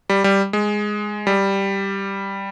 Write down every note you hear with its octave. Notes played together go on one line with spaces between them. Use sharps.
G3
G3
G#3
G3